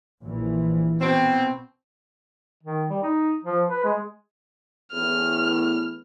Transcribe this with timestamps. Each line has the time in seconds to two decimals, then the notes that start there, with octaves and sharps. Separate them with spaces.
0.21 A#1 A#2 E3
1.01 B2 C4
2.64 D#3
2.90 G3
3.03 D#4
3.44 F3
3.69 B4
3.85 G#3
4.93 E2 A2 E3 F6